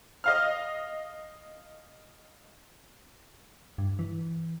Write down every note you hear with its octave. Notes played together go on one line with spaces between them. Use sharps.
D#5 F5 F6
G2
E3